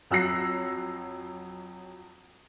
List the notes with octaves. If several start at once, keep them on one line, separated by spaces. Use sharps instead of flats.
F2 F#3 E6 F#6 A#6 C7